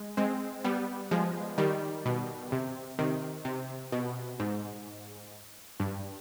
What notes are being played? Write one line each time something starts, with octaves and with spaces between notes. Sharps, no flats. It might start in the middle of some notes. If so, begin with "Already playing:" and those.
Already playing: G#3
G#3 C4
G3 B3
F3 G#3
D#3 G3
B2
C3
C3 D#3
C3
B2
G#2
G2